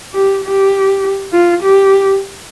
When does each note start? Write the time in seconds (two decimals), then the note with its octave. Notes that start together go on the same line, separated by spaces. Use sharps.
0.14 G4
0.45 G4
1.33 F4
1.63 G4